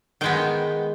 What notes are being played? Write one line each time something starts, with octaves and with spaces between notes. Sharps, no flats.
D#3 G#3 B3 G5